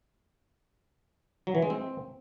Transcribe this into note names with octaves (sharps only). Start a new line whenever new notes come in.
F#3
E3
G#3
C4